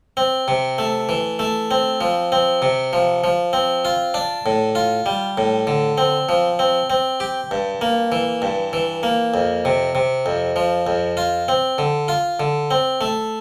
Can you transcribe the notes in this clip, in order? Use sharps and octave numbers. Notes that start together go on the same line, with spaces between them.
C4
C3
A3
E3
A3
C4
F3
C4
C3
F3
F3
C4
F4
D4
A2
F4
G3
A2
D3
C4
F3
C4
C4
G4
G2
A#3
E3
G2
E3
A#3
F2
C3
C3
F2
F3
F2
F4
C4
D3
F4
D3
C4
A3